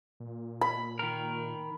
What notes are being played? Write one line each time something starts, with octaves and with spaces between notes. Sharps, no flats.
A#2
B5
D#3 A#4